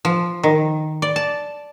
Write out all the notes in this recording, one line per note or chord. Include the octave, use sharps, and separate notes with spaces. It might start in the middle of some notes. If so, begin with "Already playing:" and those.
F3
D#3
D5
A5